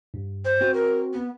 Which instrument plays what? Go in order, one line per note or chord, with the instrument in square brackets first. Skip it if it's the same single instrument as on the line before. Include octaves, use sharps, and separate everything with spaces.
[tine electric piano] G2
[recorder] C5
[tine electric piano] C4 F#4
[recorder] A#4
B3